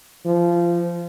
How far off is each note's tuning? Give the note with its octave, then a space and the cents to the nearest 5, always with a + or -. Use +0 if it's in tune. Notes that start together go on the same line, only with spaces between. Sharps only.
F3 -20